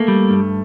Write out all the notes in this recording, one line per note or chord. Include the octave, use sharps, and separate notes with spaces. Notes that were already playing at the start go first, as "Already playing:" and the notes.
Already playing: A3 A#3
G3
G2